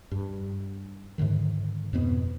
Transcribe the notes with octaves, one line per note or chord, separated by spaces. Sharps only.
G2
G#2 B2 D3 D#3
F2 G#2 B2 B3